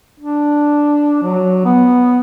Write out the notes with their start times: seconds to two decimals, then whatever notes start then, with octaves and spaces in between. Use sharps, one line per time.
0.20 D4
1.23 F#3
1.65 B3